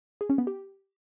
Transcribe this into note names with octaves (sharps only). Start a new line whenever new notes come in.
G#4
C#4
B3
G4